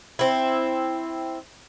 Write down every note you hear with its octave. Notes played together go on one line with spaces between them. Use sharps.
C4 E4